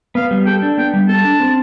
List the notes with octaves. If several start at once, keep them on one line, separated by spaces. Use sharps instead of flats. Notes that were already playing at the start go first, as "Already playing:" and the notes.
B3 F5
G3
A4 G5
D4
B3 G5
G3
A4 A5
D4
C4